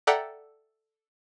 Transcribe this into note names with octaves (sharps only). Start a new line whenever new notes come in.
A4 D5 E5 F#5 G5 A#5